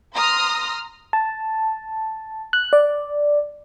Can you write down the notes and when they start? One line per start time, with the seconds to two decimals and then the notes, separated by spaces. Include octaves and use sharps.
0.16 A#5 C6 D#6 F6
1.13 A5
2.53 F#6
2.73 D5